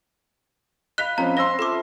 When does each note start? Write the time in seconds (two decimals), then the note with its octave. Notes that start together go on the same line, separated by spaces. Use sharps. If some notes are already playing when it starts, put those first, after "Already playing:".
0.98 D#5 F5 B5 F#6 B6 G7
1.18 F3 C4 C#4 A#5
1.37 C5 C6 E6 A#6
1.59 F4 A4 E5 A5 D6